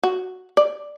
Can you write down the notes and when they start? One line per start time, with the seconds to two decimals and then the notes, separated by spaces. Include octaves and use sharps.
0.03 F#4
0.57 D5